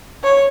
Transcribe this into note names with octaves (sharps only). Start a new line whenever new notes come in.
C#5